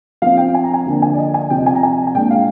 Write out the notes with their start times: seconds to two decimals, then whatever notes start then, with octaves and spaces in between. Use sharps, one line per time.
0.22 F3 C4 F5
0.37 G5
0.54 G#5
0.64 A#5
0.74 G#5
0.86 D3 F3 A#3 D4
1.02 G#5
1.14 D5
1.18 D#5
1.34 G#5
1.50 C3 F3 C4 G5
1.58 D#5
1.66 G#5
1.75 A#5
1.83 G#5
2.07 G#5
2.15 A#2 G#3 D4 G5
2.31 F5